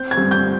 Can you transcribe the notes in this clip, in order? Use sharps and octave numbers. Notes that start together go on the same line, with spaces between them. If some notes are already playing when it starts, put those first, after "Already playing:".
Already playing: C4 G6
G#6
G2
G6